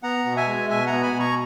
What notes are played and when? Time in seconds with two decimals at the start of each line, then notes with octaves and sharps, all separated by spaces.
0.03 B3 F#5 A#5
0.26 B2
0.36 E5 G#5
0.47 G#3
0.69 B2 E5 G#5
0.86 F#5 A#5
0.93 B3
1.03 G#5 B5
1.14 B2
1.19 A#5 C#6